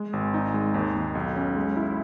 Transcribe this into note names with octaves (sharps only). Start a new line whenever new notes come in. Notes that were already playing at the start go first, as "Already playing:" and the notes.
Already playing: G#3
G#1
D#4
G#3
D#2
D#2
B1
C#4
G#3
E4